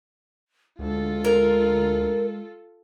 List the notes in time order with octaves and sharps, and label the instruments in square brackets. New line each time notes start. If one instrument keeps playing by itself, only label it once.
[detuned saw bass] D2 [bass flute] G#3 [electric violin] F4 A4
[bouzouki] A#4